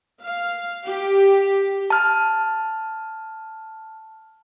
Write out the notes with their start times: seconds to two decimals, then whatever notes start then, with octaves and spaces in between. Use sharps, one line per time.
0.23 F5
0.86 G4
1.90 A5 F6